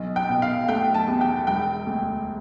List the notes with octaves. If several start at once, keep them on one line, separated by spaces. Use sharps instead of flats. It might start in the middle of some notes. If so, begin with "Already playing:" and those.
Already playing: B1
G5
B2
F5
A3 G5
A5
E2
G5
E1 G5
D2